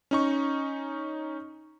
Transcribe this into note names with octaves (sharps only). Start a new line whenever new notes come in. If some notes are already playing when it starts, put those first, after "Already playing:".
C#4 D#4 C#6